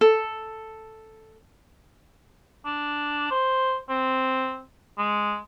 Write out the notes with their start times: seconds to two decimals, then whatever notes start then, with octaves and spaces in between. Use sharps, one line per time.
0.01 A4
2.66 D4
3.31 C5
3.89 C4
4.98 G#3